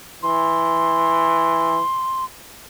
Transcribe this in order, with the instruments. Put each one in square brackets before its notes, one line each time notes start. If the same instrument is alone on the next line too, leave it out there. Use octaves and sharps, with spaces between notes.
[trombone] E3 [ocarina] C6